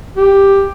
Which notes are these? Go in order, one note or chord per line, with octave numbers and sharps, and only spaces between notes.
G4